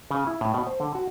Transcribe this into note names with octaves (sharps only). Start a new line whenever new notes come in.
C#3
E4
A2
B2
C5
D3
F#4